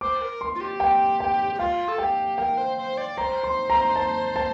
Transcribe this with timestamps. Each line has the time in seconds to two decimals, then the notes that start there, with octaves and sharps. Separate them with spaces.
0.01 C5 D6
0.21 A#4
0.41 C6
0.55 F4
0.61 G4
0.80 G5
1.20 G5
1.55 G4
1.59 F4 F5
1.88 A4
1.98 G4 G5
2.38 A#4 G5
2.57 C5
2.77 C5
2.97 D5
3.17 C5 A#5
3.44 C6
3.70 A#5
3.96 A5
4.36 A5